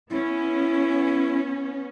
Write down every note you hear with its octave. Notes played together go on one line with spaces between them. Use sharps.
B3 C#4 E4